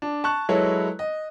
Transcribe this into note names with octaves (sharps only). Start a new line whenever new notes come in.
D4
A5 C#6 F#6
F#3 G#3 E4 A4 B4 C#5
D#5